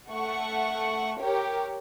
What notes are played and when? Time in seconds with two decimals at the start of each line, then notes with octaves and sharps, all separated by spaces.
0.11 A3 F#5 C#6
1.20 G4 A#4 C#5